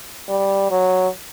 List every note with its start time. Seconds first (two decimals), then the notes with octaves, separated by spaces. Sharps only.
0.29 G3
0.71 F#3